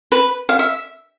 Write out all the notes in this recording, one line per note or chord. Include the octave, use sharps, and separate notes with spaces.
B4
F5
E5